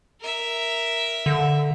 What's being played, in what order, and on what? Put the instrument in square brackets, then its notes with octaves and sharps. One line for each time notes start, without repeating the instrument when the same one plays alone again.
[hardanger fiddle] A#4 E5
[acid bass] D3